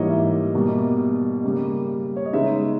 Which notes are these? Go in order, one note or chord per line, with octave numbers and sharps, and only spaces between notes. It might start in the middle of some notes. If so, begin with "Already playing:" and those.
Already playing: G#2 E3 G3 A#3 D#4 C#5 D#5
E5
B2 G3 A#3
C#3 G3 A#3
C#5
D#5
C#3 G#3 B3 D#4 E5